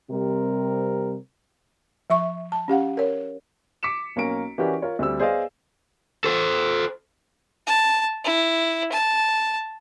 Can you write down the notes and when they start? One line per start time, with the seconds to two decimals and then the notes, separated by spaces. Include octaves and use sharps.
0.10 C3 G3 C4 A#4
2.10 F3 E5 C#6
2.52 A5
2.68 C#4 G4 F5 F#5
2.97 A#4 C#5
3.83 D6 B6 C#7 E7
4.16 B1 A#3 C#4 A#4 A#5 D7
4.58 E3 C#4 F#4 G4 A#4 D5
4.82 F4 A#4 C#5
4.99 D2 G3 C4 E6
5.19 B3 G#4 C5 D5 D#5 F5
6.24 A4 C5
7.66 A5
8.24 E4
8.92 A5